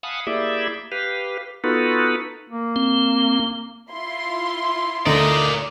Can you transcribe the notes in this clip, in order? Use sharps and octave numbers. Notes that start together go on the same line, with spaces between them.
F5 F#5 G#5 A5 B5 D#6
A#3 E4 G4 G#4 D5 E5
G4 B4 F5
B3 D#4 F4 F#4 A4 B4
A#3
C4
E4 F4 C6
D2 D#4 A#4 D5